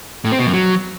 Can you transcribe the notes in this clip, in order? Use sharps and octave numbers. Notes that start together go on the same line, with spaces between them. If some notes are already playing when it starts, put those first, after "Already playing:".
A2
C4
B2
F#2
F#3